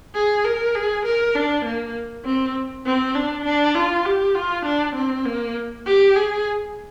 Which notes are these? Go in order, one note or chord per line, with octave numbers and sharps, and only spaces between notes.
G#4
A#4
G#4
A#4
D4
A#3
C4
C4
D4
D4
F4
G4
F4
D4
C4
A#3
G4
G#4